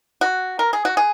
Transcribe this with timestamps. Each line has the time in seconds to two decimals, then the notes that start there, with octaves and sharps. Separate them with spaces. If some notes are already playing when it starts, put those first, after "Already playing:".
0.21 F#4
0.59 A#4
0.73 G#4
0.85 F#4
0.97 G#4